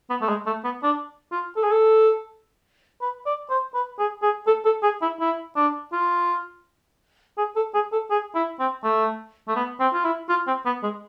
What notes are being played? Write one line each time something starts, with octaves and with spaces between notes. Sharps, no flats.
B3
A3
G#3
A3
B3
D4
F4
A4
G#4
A4
B4
D5
C5
B4
G#4
G#4
A4
A4
G#4
E4
E4
D4
F4
G#4
A4
G#4
A4
G#4
E4
C4
A3
A3
B3
C4
F4
E4
F4
C4
B3
G#3